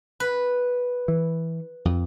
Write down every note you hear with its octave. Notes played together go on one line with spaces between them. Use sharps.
B4
E3
F2